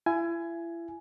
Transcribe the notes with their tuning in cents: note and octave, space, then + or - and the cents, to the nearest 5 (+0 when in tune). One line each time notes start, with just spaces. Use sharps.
E4 +35 G#5 +10